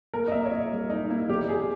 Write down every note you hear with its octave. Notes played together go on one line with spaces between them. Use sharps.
A#3 A#4
D#5
A#3 E5
C#5
A#2 D#5
G3
G3 D#4
A#3 E4
E2 G4
E2 G#4